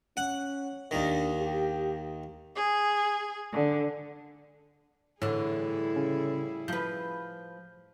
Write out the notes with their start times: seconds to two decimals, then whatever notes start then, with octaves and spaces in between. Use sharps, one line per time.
0.17 C#4 F#5
0.91 D#2 D#3 D4
1.42 G4
2.55 G#4
3.52 D3
5.22 A2 D3 E3 G3 E4 G#4
5.96 C#3 C#4
6.68 F3 B4 G6